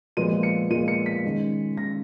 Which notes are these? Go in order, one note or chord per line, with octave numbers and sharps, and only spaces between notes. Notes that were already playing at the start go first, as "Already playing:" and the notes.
A#2 F3 G#3 B3 D#7
C#7
A#2 F3 G#3 B3 D#7
C#7
B6
D#3 G#3 C#4
D#3 G#3 C#4 A#6